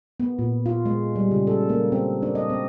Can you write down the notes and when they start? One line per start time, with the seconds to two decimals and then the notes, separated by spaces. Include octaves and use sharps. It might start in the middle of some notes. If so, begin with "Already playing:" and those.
0.20 B3
0.39 A#2
0.66 F4
0.86 G#3
1.16 G3
1.31 C#3
1.47 A4
1.69 A#3
1.92 C4
2.23 D4
2.35 D#5
2.50 C4